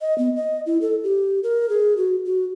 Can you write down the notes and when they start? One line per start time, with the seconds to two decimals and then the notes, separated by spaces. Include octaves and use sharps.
0.01 D#5
0.18 B3
0.36 D#5
0.66 E4
0.81 A4
1.04 G4
1.43 A#4
1.70 G#4
1.97 F#4
2.26 F#4